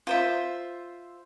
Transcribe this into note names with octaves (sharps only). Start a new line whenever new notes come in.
F4 C5 E5